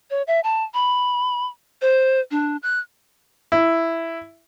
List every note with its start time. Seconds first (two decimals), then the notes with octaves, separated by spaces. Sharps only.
0.10 C#5
0.27 E5
0.44 A5
0.74 B5
1.82 C5
2.31 D4
2.63 F#6
3.52 E4